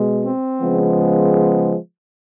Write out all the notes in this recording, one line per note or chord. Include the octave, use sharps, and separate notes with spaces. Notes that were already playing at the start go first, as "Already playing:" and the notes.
Already playing: B2 G#3
C4
C#3 F3 G#3 B3